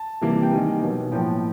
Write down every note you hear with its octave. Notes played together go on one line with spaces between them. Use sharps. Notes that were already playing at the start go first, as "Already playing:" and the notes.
Already playing: A5
C3 E3 G3 A#3
G5
D#3 G3 A#3 G#5
B2 F#3 B3
A2 F3 A#3 G5